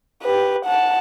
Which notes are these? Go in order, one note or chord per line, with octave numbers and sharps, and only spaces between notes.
G4 B4
F#5 A5